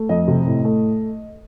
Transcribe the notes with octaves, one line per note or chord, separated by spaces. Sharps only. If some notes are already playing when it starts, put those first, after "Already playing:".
Already playing: A3
F2 D#5
C3
A2
A3